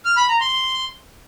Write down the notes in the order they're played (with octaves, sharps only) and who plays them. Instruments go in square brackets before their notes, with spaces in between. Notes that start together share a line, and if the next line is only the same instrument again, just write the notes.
[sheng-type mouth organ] F6
B5
A#5
C6